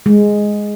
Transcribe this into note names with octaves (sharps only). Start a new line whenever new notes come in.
G#3